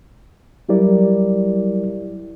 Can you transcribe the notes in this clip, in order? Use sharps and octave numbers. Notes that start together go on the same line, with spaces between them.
F#3 G3 E4 G4 A#4 D5